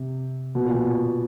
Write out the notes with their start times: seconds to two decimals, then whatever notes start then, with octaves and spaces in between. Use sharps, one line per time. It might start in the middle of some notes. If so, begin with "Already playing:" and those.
Already playing: C3
0.55 B2
0.65 A#2
0.74 B2